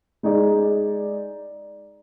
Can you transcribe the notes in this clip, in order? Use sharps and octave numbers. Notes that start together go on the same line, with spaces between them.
G#3 D#4 G#4 D5